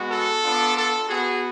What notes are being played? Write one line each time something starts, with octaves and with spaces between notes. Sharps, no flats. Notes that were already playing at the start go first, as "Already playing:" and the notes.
Already playing: G#3 B3 F#4
A4
B3 D4 F4
A4
B3 F#4 G#4